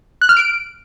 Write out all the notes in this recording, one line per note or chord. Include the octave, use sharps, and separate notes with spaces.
F#6
F6
D7